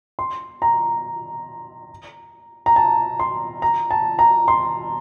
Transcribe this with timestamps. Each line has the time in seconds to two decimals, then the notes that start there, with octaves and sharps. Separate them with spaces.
0.19 C6
0.62 A#5
2.66 A#5
2.76 A5
3.20 C6
3.62 A#5
3.91 A5
4.19 A#5
4.48 C6